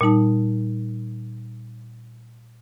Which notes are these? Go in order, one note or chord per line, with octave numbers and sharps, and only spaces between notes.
A#2 G3 D#4 A5